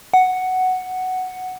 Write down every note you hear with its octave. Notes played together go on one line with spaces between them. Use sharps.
F#5